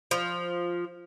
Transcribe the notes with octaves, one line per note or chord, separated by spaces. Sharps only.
F3